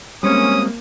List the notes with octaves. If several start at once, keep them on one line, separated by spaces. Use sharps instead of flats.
G3 G#3 A#3 C4 C#4 D#6